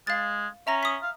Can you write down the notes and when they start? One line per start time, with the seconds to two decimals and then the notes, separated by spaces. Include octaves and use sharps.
0.07 G#3 F5 A6
0.67 C#4 E5 A#5 A#6
0.83 D#6 B6
1.02 F5